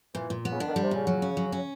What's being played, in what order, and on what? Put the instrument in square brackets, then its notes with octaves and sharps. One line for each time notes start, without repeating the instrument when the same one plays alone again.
[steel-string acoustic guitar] A#2 [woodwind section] E3
[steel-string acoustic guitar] A#2
B3
[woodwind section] C#3
[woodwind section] D3 [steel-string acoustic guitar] D4
[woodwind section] D#3
D3
[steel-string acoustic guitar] G3
[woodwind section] C3
[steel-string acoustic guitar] A#2 [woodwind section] C#3
[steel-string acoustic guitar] F#3
C#4
F#3
C#4